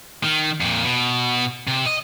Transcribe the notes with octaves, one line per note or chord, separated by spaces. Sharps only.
D#3
F2 A#2
B2
C3
D#5